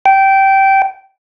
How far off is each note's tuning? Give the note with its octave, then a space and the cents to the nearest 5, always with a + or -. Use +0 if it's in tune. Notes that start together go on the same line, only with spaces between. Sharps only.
G5 -15